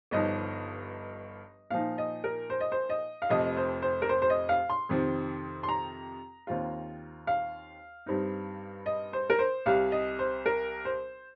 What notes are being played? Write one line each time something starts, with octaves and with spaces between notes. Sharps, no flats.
G1 G2 F3 D#4 D#5
A#2 F3 D#4 F5
D#5
A#4
C5
D#5
C5
D#5
F5
F1 F2 C3 F3 D#5
C5
C5
A#4
C5
C5
D#5
F5
C6
F2 C3 D#3 C4
C6
A#5
D#2 D#3 C4 F4
F5
G2 G3 C4 D#4
D#5
C5
A#4
C5
C2 C3 G3 F5
D#5
C5
A#4
C5